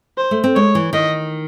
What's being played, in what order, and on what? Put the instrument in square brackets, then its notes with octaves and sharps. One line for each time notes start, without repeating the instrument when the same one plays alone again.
[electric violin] C5
[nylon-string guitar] A3
C4
[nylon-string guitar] G#3 [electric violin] C#5
[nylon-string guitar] E3
[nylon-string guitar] D#3 [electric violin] D#5